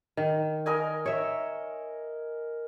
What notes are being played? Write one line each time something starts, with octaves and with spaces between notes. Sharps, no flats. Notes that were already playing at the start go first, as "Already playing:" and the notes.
D#3
A#4 D#5 G#5
C#5 E5